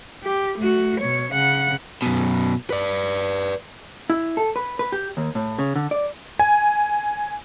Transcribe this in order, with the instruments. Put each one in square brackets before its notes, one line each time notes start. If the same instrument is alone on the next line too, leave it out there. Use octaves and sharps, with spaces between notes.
[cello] G4
A3 F#4
B2 C#5
C#3 F#5
[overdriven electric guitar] F#2 B2
B4 D5
[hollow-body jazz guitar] E4
A4
B4
B4
G4
D#2
A2
C#3
D3
D5
[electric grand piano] G#5